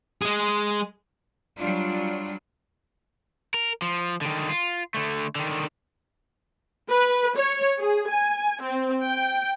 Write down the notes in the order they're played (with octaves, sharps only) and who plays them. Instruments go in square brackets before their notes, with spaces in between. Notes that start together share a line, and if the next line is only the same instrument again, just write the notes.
[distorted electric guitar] G#3 G#4
[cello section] F#3 G3 D4 F4
[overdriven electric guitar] A#4
F3
D3 D#3
F4
D3 A3
D3 D#3
[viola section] B4
C#5
G#4
G#5
C4
G5